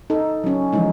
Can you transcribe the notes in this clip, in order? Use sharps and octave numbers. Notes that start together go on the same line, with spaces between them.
D#4 A4
F#3 C#4
E3 F3 G#3 D#4